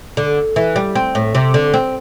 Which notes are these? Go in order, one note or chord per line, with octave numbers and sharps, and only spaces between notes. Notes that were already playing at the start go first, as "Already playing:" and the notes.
D3
E3
G3
C4
A2
C3
D3
C4